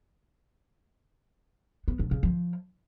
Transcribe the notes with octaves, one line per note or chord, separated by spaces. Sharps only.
B3
D3
C#3
F3